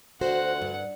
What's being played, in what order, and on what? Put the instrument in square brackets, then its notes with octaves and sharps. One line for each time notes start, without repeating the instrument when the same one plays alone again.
[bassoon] D2 [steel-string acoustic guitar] F#4 C5 [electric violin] F#5
[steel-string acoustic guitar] G2